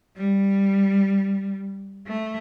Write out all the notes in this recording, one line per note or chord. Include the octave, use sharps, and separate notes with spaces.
G3
A3